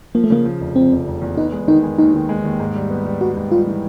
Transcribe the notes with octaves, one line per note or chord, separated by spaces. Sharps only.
F3 A#3
A3
C#3 A#3
F3
F1
F3 C4
F1
F1
E2
B3 D#4
G#3
D#3 D#4
G#3
D#2 D#4
D#3
G#3
D#2
G#2
G3
B3
G3
G3 F#4
G#2
G3 F4
E3